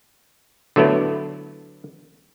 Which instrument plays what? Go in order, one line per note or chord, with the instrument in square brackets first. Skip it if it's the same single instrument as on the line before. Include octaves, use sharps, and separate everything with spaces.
[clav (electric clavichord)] D3 F#3 A3 B3 E4